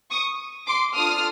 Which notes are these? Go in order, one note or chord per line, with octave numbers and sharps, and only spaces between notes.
C#6 D#6
C6 D6
D4 F4 A4 D#6 F6